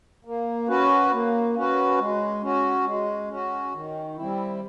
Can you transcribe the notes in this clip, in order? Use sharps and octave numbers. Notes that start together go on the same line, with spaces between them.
A#3
C#4 F#4 B4
A#3
C#4 F#4 B4
G#3
C#4 F#4
G#3
C#4 F#4
D#3
G3 C4 E4